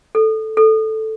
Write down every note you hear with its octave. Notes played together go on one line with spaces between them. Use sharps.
A4
A4